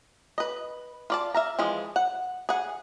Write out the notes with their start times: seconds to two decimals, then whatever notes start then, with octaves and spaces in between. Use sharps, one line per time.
0.38 B4 D#5
1.10 F4 D5 A5
1.34 E5 F5 A#5
1.59 E3 F3 G#3
1.96 F#5
2.49 G#4 F#5